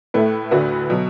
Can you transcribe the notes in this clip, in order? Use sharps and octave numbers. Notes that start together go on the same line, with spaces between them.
A2 A3 E4 B4
D2 D3 A3 F#4 B4
B2 F#3